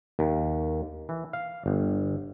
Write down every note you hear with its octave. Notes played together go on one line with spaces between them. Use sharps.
D#2
E3
F5
G1